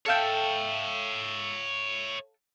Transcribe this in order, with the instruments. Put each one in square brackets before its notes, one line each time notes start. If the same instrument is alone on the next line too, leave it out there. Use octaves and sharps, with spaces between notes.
[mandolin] A4 F5 G5 [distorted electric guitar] C#5 E5